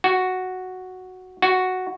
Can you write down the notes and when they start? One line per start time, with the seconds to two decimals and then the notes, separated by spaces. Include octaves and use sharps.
0.04 F#4
1.42 F#4